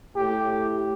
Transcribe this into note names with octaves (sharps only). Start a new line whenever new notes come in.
A2 G4